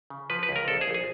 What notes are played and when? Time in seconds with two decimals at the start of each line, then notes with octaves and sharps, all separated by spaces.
0.10 C#3
0.30 F3 B4
0.43 B4
0.49 C#2
0.56 A#4
0.68 A#1 A4
0.81 G#4
0.88 A#1
0.94 G#4